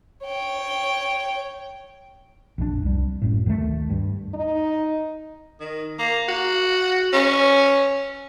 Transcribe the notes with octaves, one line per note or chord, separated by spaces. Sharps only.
C#5 G5
A#1 F2 D3 D4
C2 G3
G#1 F#2 A2
D2 D#3 G#3 A3
G2
D#4
D#3
A#3
F#4
C#4